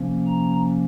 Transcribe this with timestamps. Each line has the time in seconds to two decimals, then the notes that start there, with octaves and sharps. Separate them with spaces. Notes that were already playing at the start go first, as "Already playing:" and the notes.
Already playing: C3 F3 A#3 C#4
0.26 A#5